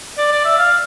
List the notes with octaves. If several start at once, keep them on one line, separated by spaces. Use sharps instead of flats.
D5
D5
E5
F5